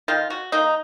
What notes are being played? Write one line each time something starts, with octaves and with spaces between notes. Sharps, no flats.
D#3 F4
F#4
A#3 D#4